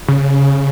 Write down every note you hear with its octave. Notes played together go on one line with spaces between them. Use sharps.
C#3